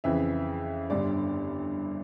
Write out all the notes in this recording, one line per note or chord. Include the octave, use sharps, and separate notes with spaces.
F2 C#3 E3 E5
G1 G2 D3 D5